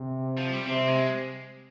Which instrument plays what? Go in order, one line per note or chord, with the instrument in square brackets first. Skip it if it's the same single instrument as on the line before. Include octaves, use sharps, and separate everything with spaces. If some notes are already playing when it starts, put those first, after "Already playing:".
Already playing: [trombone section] C3
[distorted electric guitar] F3
G3
[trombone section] C3 [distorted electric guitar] C4
[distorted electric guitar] G#3